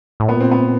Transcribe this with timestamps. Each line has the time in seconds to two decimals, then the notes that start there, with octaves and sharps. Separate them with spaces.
0.20 A2
0.28 A#2 B3
0.40 C4
0.51 B3